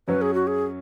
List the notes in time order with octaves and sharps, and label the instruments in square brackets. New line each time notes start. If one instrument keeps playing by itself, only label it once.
[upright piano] F#2 F#3 C#4 [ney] B4
[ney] G#4
F#4
G#4